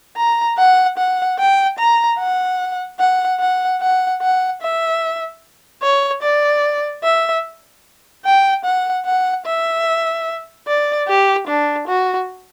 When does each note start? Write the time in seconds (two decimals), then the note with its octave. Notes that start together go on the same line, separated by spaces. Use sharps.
0.17 A#5
0.58 F#5
0.98 F#5
1.39 G5
1.79 A#5
2.19 F#5
3.00 F#5
3.40 F#5
3.81 F#5
4.22 F#5
4.62 E5
5.83 C#5
6.23 D5
7.04 E5
8.25 G5
8.65 F#5
9.06 F#5
9.46 E5
10.67 D5
11.08 G4
11.48 D4
11.88 F#4